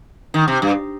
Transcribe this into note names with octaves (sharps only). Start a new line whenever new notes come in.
D#3
C3
G2